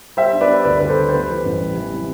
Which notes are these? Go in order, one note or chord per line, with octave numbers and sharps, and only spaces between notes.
G3 C5 E5
D4
B4 D5
G3
D2 B4 D5
D2 B4
A4 C5
D3
C5
G3 B4
E3
A1
G3
E3
C3